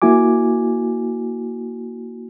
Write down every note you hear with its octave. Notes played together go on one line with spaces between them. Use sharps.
A#3 E4 F#4 G#5 D6